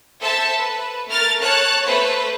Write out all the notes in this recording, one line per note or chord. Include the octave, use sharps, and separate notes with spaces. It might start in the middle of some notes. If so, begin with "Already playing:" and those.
A4 C5 E5 A5
B4
A3 A#4 F6 A6
C#5 A5 F#6
A3 B4 C5